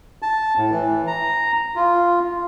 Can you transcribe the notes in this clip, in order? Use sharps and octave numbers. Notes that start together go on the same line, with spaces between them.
A5
A2
E3
A#5
F4